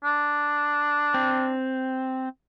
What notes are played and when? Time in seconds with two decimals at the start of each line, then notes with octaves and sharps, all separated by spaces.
0.04 D4
1.14 C4